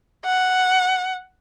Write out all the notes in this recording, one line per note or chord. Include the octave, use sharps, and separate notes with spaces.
F#5